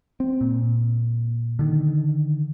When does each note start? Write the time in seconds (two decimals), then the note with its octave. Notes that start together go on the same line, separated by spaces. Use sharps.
0.20 C4
0.41 A#2
1.59 D3 D#3